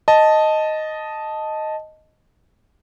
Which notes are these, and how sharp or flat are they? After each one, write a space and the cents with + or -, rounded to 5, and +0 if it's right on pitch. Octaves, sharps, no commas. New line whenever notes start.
D#5 +0 A5 -5